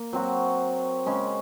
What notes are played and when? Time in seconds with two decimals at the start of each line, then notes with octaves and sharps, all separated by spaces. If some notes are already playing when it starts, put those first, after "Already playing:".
Already playing: A#3
0.13 F#3 C4 F#4
1.06 C#3 G#3 C#4